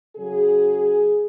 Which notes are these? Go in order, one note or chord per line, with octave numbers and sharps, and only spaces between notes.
C#3 F#3 G#4